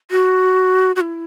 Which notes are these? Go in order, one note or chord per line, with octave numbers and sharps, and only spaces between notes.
F#4
F#4
E4